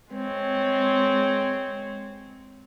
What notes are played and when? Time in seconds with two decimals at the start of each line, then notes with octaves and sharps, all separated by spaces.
0.12 G#3 C4 C#5